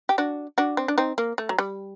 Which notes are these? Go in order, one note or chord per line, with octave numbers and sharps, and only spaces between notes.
G4
D4 F#4
D4 F#4
C4
D4
C4 D#4
A#3
A3
F#3
G3